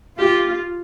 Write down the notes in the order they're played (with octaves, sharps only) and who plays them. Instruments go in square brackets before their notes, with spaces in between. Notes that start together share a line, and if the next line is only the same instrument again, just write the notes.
[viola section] F4 [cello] G4